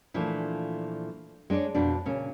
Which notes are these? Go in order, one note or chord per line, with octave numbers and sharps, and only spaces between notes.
A#2 E3 F3 A3 D4
G#3 D4 E4 C#5 D5
F2 B2 D4
A#2 C#3 C#4